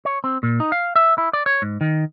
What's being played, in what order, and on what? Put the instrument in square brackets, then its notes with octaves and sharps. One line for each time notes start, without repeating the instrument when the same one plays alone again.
[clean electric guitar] C#5
C4
A#2
D#4
F5
E5
E4
D5
C#5
G#2
D#3